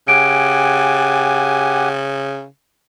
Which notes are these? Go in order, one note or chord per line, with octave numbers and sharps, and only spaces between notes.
C#3 G4 F#5 G#5 D7